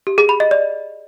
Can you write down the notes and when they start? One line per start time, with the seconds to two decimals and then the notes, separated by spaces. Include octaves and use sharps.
0.07 G4
0.18 G#4
0.29 B5
0.40 D#5
0.51 D5